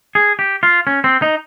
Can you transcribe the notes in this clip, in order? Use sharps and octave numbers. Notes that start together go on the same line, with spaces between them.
G#4
G4
F4
C#4
C4
D#4